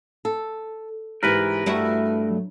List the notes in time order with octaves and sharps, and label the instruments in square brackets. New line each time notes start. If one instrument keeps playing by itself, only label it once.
[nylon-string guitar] A4
[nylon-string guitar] G#2 E3 [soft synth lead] G4 [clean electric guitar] A#4 B4
[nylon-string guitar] G2 [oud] A3 E4 F#4
[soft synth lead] F#3